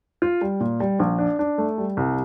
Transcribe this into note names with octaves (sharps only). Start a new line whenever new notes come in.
F4
G3
A#2
G3
A#1
D4
D4
A3
G3
C2